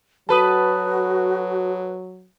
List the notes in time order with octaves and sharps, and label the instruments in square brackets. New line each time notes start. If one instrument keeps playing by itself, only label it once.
[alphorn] F#3 [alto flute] F#4 [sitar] A4 B4 [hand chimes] A5 B5 D#6